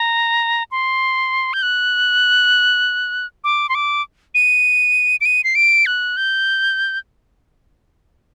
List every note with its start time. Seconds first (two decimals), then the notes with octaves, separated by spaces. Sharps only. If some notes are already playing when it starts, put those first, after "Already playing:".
Already playing: A#5
0.71 C6
1.53 G6
1.62 F#6
3.44 D6
3.69 C6
3.75 D6
4.35 D#7
5.21 D7
5.25 D#7
5.44 C7
5.55 D7
5.86 F#6
6.17 G6